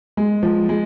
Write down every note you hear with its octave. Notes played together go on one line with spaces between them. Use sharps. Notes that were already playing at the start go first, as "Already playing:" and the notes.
G#3
F3
G#3